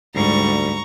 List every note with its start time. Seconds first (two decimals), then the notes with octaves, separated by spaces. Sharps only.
0.15 D2 G#2 G3 A#5 C#6